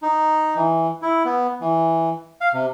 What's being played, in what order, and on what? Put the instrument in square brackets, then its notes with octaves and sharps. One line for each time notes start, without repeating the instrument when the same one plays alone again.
[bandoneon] D#4
E3
E4
B3
E3
F5
C3